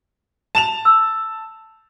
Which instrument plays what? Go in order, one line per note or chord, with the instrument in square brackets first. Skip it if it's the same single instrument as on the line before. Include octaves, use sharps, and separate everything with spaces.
[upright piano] A5 E7 F7
[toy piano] E6